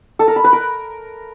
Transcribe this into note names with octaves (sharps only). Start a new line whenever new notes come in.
A4
A#4
B5
B4
A#4